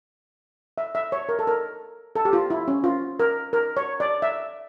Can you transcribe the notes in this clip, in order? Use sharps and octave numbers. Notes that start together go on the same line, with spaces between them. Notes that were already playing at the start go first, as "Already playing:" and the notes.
E5
E5
C#5
A#4
A4
A#4
A4
G4
F4
E4
C#4
F4
A#4
A#4
C#5
D5
E5